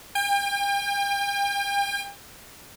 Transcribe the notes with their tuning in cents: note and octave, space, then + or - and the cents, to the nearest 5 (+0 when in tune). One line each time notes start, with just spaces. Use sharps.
G5 +40